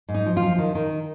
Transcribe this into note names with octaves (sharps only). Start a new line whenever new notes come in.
G#2
D#4
F3
F4
F3
D#3
D#3